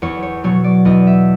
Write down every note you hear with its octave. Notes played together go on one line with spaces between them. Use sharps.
E2 C#5
C#5
B2 F#3 C#5
D5
E2 D#5
E5